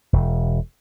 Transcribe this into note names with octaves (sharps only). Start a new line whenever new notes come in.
E1